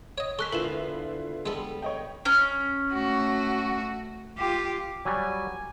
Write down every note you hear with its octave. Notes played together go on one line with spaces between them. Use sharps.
C#5 D#5
G#3 A4 A#4 C5 C#6 F#6 B6
D3 B3 E4 F4 A#4 B4 E7
G3 G#3 B3 A4
C#5 D#5 G5
C#4
A3 F#4
F4 G4
F#3 G3 G#5